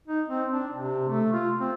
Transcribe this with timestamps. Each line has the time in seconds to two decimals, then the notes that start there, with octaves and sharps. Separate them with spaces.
0.08 D#4
0.28 C4
0.51 D4
0.73 C3
1.09 A3
1.33 F4
1.59 C4